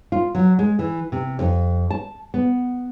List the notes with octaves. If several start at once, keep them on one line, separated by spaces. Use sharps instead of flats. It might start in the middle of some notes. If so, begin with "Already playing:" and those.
F4
F#3
G#3
E3
C3
F2
A5
B3